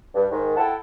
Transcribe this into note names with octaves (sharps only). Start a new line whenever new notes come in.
G2
G#2 D#3
E4 A4 F#5 G5 A5